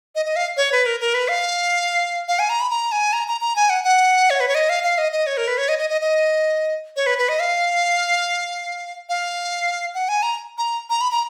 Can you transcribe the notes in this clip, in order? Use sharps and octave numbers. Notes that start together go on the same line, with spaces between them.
D#5
D#5
F5
C#5
B4
A#4
A#4
B4
F5
F5
G#5
A#5
B5
A#5
G#5
A#5
A#5
A#5
G#5
F#5
F#5
C#5
B4
C#5
D#5
F5
F5
D#5
D#5
C#5
A#4
B4
C#5
D#5
D#5
D#5
D#5
C#5
B4
B4
D#5
F5
F5
F#5
G#5
A#5
A#5
A#5
B5
A#5